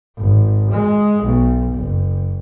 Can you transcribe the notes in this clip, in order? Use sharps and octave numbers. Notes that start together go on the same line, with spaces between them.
G#1
G#3
B1
F#1